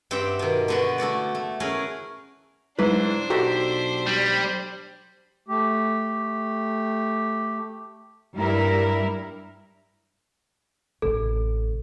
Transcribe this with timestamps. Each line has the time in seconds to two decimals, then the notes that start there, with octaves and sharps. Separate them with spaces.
0.11 G2 C4 G4 E5 F#5 G5
0.39 B2 D#3
0.68 D3 B3 F#4
0.98 A3 E4 F#4 D5
1.35 A3
1.60 C#4 E4 G#4 A#4 B4
2.79 G#2 E3 D4 B4 C5
3.30 B1 F#4 G4 A4 A#5
4.07 G3
5.48 A3 G4
8.36 G2 G3 E4 A#4
11.02 A1 C3 A4